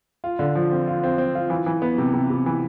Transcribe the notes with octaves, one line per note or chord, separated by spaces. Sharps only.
F4
D3
F3
C4
F4
C4
C4
F4
E3
E3
B3
C3
C3
C3
E3